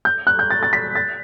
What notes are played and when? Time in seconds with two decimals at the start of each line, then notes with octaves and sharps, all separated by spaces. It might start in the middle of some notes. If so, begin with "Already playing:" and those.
0.05 G6
0.27 F#6
0.39 G6
0.50 A6
0.63 A6
0.73 B6
0.95 A6